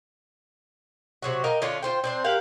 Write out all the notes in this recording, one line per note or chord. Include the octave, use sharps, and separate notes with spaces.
C3 F#3 F#4
A#4 D#5 F5 G5
D3 C#4 D4 F4
F4 C5 G5
C4 D4 C5
G4 A#4 F5 F#5